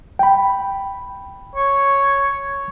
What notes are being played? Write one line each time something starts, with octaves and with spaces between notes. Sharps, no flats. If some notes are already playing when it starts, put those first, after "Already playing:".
G5 B5
C#5